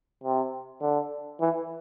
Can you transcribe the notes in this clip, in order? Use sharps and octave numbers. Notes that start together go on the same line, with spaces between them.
C3
D3
E3